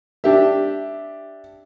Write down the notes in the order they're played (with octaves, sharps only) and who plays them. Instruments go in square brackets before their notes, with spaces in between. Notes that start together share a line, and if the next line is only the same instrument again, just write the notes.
[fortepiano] D4 G4 E5